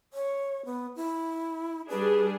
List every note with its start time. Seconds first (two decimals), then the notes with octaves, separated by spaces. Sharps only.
0.14 C#5
0.65 B3
0.96 E4
1.90 G3 D4 G#4 B4